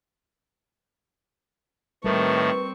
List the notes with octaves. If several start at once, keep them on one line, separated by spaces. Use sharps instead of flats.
A2 D#3 G3 A3 C4 A#4 B4 C#6